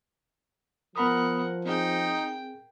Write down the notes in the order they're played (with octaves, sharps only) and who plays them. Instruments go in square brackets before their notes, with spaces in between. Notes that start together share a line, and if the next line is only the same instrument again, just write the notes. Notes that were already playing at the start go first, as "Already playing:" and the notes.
[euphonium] F3 [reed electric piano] B3 B5 D#6 [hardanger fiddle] A#4 F#5
[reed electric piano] C4 G#4 [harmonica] D#4 [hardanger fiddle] G5